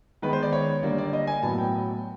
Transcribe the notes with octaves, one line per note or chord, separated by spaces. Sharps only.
D#3 G#3 B3 B4
C5
D5
C#5
D3 G3 A#3 D5
D5
D#5
G#5
A2 F#3 B3 A5
G5